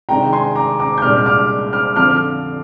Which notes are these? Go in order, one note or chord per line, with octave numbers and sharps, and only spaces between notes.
C3 D#3 G#3 D4 G5 A#5
G#5 C6
A#5 D6
A#5 D6
G6
C2 A#2 G#3 D4 D6 F6
D6 F6
D6 F6
F2 D3 F3 C4 D6 F6